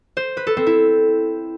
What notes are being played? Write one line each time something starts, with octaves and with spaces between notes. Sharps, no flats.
C5
B4
A4
C4
E4